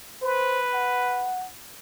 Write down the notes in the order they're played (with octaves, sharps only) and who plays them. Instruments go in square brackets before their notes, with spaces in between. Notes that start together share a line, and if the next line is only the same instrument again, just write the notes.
[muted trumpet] B4 [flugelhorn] C5
[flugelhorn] F#5